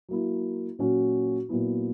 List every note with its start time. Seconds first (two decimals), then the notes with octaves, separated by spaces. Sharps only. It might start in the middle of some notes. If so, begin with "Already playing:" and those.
0.09 F#3 A#3 E4
0.79 A#2 F#3 C#4 F#4
1.49 A#2 F#3 B3 E4